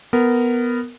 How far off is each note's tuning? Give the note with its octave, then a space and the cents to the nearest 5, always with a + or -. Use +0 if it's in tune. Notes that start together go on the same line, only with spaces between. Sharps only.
B3 +0 A#4 -10